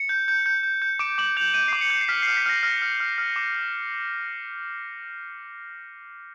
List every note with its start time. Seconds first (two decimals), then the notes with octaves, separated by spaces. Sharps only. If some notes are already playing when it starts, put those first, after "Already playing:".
Already playing: C#7
0.09 G6
0.28 G6
0.46 G6
0.63 G6
0.82 G6
0.99 D6 D7
1.18 D6 F#7
1.37 G6 F7
1.54 G6 D#7
1.68 D6 C7
1.81 C#7
1.90 G6
2.01 C7
2.08 F6 B6
2.22 F6 C7
2.37 B6
2.46 F6 A#6
2.63 F6 A#6
2.82 F6
3.00 F6
3.18 F6
3.36 D6